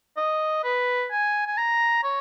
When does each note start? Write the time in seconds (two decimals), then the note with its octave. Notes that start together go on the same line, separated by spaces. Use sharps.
0.17 D#5
0.64 B4
1.11 G#5
1.47 G#5
1.58 A#5
2.04 C#5